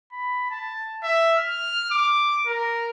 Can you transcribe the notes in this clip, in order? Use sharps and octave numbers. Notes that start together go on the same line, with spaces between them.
B5
A5
E5
F6
D6
A#4